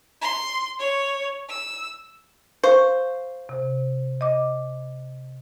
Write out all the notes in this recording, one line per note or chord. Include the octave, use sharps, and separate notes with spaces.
C6
C#5
E6
C5 F5 C#6
C3
D#5 D6